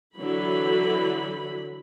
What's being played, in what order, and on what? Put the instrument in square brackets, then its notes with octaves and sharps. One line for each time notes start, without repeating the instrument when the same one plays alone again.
[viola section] D3 E3 F#3 B5